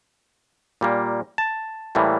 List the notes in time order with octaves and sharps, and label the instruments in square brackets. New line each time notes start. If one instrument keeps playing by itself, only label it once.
[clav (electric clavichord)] A#2 G3 A#3
A5
A2 E3 G3 A#3